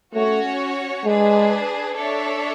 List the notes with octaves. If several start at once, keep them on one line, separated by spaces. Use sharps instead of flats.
A3 C#4 F#4 C#5
G#3 D4 G#4 B4
D4 A4 C#5 E5